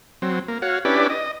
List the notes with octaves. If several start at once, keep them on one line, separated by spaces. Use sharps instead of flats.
F#3 C4
A#3
F#4 C#5 F5
C#4 D4 E4 G4 B4 D5
D#5